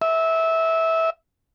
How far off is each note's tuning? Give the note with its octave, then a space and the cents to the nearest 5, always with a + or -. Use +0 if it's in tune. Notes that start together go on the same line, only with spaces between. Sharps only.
E5 -20